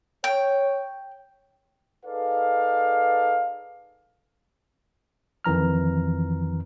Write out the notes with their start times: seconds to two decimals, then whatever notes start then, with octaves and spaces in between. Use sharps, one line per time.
0.24 C#5 G5
2.06 D#4 G#4 A4 B4 D5 F5
5.44 F2 D#3 E3 A#5 F6